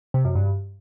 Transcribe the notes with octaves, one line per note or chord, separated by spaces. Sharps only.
C3
F#2
G2